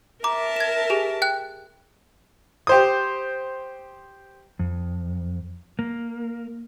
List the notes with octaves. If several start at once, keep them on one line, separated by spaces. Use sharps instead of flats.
A#4 E5 A5 A#5 D6
G#6 E7
G4 G#4 G#5
G5 F#6
G4 C5 D#6
F2
A#3